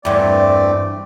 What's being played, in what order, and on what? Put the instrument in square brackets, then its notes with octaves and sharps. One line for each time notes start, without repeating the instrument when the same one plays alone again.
[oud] E2 G2 [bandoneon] A3 C4 [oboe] D5